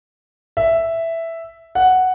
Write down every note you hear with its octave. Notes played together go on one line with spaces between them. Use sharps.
E5
F#5